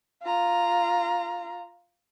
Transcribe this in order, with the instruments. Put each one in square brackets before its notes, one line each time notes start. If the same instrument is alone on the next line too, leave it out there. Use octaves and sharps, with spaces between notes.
[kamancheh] F4 A#5